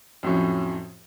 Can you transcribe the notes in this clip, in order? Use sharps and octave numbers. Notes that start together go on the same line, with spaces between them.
F2 A2 F#3 C#4